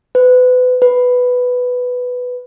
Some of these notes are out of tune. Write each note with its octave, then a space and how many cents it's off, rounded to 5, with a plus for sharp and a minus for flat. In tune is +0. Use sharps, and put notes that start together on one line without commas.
B4 +30
B4 +5